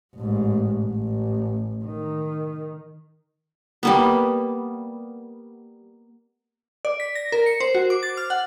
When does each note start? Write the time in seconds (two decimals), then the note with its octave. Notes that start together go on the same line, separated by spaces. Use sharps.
0.16 A1 G#2
0.85 A1
1.84 D#3
3.83 G3 A#3 B3
6.85 D5
7.00 B6
7.15 A#6
7.32 A#4
7.46 C#7
7.60 C5
7.75 F#4
7.90 D6
8.03 A6
8.17 F6
8.30 F#5